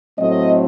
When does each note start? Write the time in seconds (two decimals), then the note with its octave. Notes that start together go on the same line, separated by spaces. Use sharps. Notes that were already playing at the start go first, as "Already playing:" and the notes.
0.19 A2 F#3 A3 C4 D#5